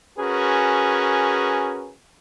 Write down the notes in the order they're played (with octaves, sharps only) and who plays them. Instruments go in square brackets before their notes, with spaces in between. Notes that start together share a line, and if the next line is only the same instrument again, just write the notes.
[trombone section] C#4 F#4 G#4 A#4 B4